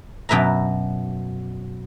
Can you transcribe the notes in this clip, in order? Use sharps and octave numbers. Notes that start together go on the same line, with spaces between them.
F#2 B2 B4 E5 A#5